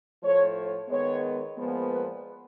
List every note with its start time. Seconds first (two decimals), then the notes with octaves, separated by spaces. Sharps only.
0.22 A2 F3 A3 C#5
0.89 D#3 G#3 B3 C#5
1.57 A#2 F3 G#3 B3
1.90 B4